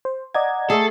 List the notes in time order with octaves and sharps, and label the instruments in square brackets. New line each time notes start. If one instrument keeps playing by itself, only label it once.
[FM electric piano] C5
[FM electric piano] D5 D#5 G#6 [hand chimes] F#5 A#5
[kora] A3 G#4 [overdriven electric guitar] A4